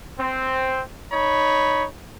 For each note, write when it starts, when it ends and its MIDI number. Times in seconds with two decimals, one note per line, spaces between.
0.19 0.82 60
1.12 1.86 63
1.12 1.86 73
1.12 1.86 83